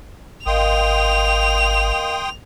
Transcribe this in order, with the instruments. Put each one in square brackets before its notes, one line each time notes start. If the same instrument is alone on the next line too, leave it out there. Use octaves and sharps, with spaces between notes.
[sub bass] G#1 [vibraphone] A#4 D#5 F5 [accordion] G5 C6 D#6 [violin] F7